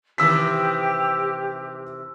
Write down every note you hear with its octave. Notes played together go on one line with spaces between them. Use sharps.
C3 D#3 E3 G4 E6 B6